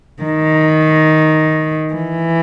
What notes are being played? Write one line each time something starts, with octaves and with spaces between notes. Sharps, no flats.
D#3
E3